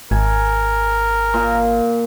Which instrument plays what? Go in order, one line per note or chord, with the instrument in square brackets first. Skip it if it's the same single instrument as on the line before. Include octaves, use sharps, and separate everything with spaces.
[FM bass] G#1 [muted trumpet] A#4 [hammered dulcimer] G#5
[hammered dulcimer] A#2